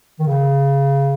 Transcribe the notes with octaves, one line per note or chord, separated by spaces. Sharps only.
D#3
C#3